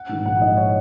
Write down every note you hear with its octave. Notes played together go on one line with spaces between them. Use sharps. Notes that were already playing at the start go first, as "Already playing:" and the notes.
Already playing: F#5
G#2 D#3
A#1 F#5
G#2 D#3 D#5
C#5